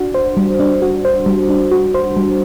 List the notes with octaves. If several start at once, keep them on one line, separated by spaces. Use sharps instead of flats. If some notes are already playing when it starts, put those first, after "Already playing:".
Already playing: D4 F#4
C5
G3
D4
F#4
C5
G3
D4
F#4
C5
G3